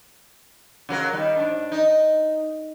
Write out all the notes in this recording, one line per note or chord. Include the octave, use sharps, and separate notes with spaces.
C#3 F#3 A#4
D#3 G3
G#2 D4
D#4